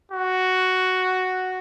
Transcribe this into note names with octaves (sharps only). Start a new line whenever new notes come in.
F#4